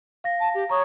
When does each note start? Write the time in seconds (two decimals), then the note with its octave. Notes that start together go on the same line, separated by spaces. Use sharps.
0.24 F5 A#6
0.39 A5
0.54 G4
0.70 C#5 A#5 C#6 D#6